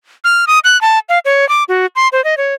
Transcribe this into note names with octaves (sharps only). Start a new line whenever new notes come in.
F6
D#6
F#6
A5
F5
C#5
D6
F#4
C6
C5
D#5
C#5